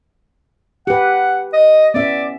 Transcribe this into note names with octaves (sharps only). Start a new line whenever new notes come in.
G4 B4 F#5
D#5
B3 C#4 D5 E5